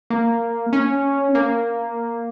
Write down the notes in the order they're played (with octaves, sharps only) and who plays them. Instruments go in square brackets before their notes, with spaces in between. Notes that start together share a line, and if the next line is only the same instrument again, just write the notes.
[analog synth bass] A#3
C#4
A#3